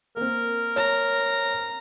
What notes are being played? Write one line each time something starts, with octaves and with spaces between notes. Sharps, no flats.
A#3 C4 A#4
C#5 A#5